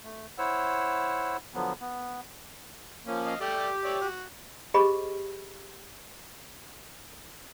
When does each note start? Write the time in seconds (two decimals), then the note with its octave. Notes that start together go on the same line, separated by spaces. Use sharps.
0.04 A3
0.38 E4 C5 C#5 F#5 E6
1.54 D3 F3 F#3 B3
1.81 B3
3.06 F3 A#3 C#4
3.26 D#5 F5
3.41 G3 A3 G4 D5
3.85 C#5 D5 E5
4.01 F#4
4.74 G4 G#4 C5 D#5 B5 C#6